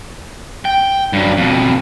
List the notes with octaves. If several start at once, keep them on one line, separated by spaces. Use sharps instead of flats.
G5
G2 F#3
F2 B2